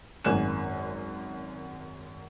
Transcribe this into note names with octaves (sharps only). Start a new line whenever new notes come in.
G#1 F#2 A#3 G#5 F#6 E7